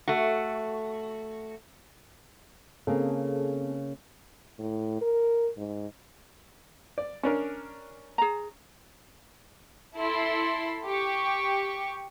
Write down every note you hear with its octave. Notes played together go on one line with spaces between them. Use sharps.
A3 F#4
C#3 A#3 C4 G#4 A4
A2
A#4
G#2
D5
C#4 D4 A#4
G#4 A#5
E4 A4 B5 C6
G4 C#6